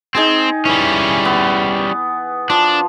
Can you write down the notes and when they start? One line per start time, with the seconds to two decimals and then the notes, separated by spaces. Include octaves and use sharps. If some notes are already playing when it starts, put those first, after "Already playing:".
0.15 C4 D#4 G#4 G5
0.65 E3 G3 C#4
1.25 B3
2.50 F3 D4